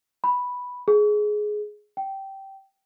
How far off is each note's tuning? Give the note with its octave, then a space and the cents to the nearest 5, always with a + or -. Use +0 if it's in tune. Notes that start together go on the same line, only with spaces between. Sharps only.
B5 -5
G#4 +15
G5 -15